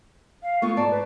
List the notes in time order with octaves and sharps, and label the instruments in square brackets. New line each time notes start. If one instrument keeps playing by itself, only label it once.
[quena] F5
[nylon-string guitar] A3 B3 F4 [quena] C#6
[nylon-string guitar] G#2 D5 [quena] A5
[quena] B4